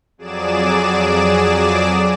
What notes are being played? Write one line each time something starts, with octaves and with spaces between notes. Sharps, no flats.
F2 F#3 G#4 D5 D6 E7